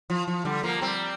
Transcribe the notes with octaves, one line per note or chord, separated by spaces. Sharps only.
F3
F3
D3 G3
F3 A#3
G3 C4